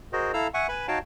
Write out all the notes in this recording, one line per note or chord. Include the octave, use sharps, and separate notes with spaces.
F#4 G#4 A#4 C5 D#5
E4 A4 F5 A#5 E6
E5 F#5 G#5 C#6
B4 G#5 B5
D#4 F#4 C#5 F5 G5 A5